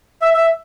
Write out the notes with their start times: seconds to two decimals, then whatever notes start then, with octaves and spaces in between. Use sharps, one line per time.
0.22 E5
0.34 E5